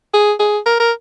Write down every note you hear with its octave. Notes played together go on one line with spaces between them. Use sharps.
G#4
G#4
A#4
A#4